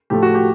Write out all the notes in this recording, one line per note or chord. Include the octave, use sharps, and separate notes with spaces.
A2 F3 A3 G4
F#4
G4